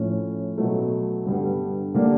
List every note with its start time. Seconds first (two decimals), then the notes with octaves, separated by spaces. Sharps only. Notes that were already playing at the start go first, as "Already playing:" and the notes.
Already playing: A2 F3 A3 C#4
0.58 B2 F#3 A3
1.25 G2 D3 G3 B3
1.94 D3 G3 A#3 D4